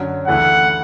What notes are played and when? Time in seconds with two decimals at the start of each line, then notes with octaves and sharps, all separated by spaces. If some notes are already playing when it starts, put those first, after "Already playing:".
Already playing: F#2 D3 F#3 C#4
0.27 D2 C#3 E3 A3 E4 F#5